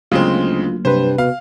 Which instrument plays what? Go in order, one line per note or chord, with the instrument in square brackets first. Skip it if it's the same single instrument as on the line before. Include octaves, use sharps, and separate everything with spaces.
[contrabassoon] D2 [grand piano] C#3 G#3 C4 [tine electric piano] F#3 A#3 [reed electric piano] F4
[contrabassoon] G2 [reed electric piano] C3 B4 [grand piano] C5
[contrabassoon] B2 [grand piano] F5